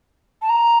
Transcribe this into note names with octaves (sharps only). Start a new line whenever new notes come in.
A5
A#5